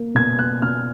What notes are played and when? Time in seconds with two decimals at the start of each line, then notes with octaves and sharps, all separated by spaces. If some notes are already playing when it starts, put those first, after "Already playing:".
Already playing: A#3
0.15 B2 G#6
0.39 A#3 F#6
0.62 B2 F6